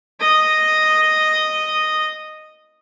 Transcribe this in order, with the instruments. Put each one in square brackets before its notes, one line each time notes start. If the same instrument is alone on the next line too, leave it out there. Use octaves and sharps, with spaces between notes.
[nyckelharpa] D#5 D#6